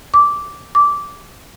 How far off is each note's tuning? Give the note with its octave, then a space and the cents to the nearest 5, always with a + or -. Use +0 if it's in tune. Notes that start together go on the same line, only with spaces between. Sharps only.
D6 -10
D6 -15